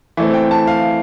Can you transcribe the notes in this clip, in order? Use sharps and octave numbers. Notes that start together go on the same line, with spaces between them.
E3 A3 C4
G5
A5
F5